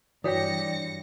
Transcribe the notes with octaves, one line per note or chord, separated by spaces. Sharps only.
G2 E3 F#4 C#5 D5 G5 A#6 C#7